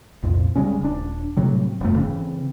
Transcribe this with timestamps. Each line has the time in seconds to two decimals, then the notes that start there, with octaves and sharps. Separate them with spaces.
0.23 C2 F2 A#2
0.56 C#3 G3 G#3 C#4
0.81 D#1 D4
1.37 A2 C3 F#3 G3
1.81 F1 G2 A3
1.96 C#3 E3 C4